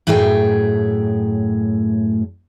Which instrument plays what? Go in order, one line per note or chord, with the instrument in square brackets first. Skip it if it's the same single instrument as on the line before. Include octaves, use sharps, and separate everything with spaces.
[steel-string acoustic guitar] F#2 A2 A3 G#4 C#5 G5